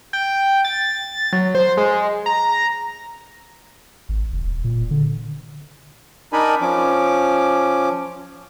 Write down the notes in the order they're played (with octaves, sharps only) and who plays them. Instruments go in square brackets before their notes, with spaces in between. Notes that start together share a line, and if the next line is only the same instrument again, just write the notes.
[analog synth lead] G5
A6
F#3
C5
G#3
A#5
[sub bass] G#1
F1
D#1
A#2
D3
[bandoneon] D4 D#4 A#4 D5 G#5 B5
F3 C#4 D6